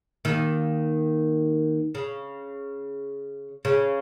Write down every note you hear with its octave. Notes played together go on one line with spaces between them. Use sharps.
D#2 D#3
C#3
C#3